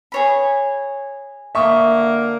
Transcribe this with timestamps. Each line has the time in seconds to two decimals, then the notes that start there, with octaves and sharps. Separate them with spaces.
0.12 G#4 C#5 B5
1.55 D3 A#3 E5 C#6 D#6